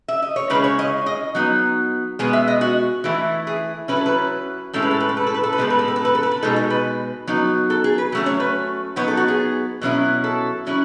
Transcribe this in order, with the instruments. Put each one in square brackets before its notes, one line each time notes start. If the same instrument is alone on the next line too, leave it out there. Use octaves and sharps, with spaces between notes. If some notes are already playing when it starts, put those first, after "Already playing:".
[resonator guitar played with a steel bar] E5
D#5
C#5
C#3 G#3 C#4 E4 B4
C#5
D#5
D#5
F#3 B3 D#4
B2 G#3 B3 G#5
E5
D#5
F#4
E3 A3 E4
G#4
F#3 C#4 E4 B4
A4
B4
A2 G#3 C#4 E4 A4
B4
A4
B4
A4
B4
A4
B4
A4
B4
A2 E3 G#3 B3 A4
B4
A4
B4
A4
B4
A4
B4
A4
B2 G#3 D#4 A4
A4
B4
F#3 B3 D#4
A4
G#4
B4
F#3 A3 C#4
C#5
B4
F#3 B3 D#4 C#5
A4
F#4
G#4
B2 F#3 C#4 E4
A4
F#3 C#4 E4